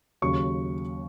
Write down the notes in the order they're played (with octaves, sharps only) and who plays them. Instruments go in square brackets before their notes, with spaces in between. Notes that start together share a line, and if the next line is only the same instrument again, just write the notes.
[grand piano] D#2 C#3 F#3 C#6